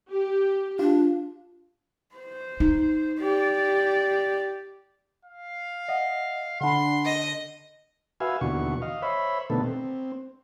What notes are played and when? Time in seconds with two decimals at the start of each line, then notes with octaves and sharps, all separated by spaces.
0.12 G4
0.79 D4 F4
2.16 C5
2.60 D#4
3.19 G4 D5
5.25 F5
5.88 D#5 E5 F#5
6.61 D3 D4 F#5 B5 C6
7.05 D#5
8.20 F#4 B4 E5 F5 G#5
8.41 D#2 B2 D3 E3 F#4 C#6
8.82 D#5 F5
9.02 C5 C#5 E5 B5
9.50 B2 D3 D#3 A3 B3 A4
9.64 C4